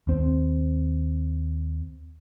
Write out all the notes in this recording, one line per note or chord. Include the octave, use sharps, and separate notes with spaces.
D#2 C4